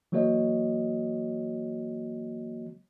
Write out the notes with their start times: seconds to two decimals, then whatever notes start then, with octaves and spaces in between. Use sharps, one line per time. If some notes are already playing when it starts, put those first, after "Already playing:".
0.12 E3 F#3 A#3 F#4 C#5 D#5